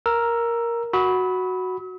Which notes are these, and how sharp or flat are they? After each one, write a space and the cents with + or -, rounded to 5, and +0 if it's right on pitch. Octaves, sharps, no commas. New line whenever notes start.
A#4 +5 E6 +15
F#4 +0 B5 +0 E6 -45